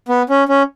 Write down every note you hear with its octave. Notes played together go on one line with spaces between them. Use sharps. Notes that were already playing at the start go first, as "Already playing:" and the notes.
B3
C#4
C#4